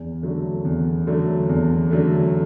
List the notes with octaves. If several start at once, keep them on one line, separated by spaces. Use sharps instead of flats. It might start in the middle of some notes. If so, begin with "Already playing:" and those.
Already playing: E2
D3 F#3 A3
E2
D3 F#3 A3
E2
D3 F#3 A3